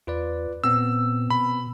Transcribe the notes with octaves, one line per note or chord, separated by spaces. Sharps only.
E2 F4 B4 D5
A#2 B3 C4 E6
B2 B5